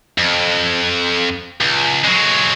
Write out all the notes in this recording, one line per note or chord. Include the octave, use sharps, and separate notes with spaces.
F2
C#2
F#3 G#3